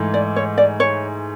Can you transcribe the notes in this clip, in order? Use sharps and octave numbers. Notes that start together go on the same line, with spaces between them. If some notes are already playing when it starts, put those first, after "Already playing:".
Already playing: G#2 E3 A3
D5
C#5
D5
C#5